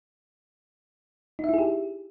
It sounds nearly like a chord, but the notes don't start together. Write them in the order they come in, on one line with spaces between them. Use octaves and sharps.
D#4 E5 E4 G#4 G4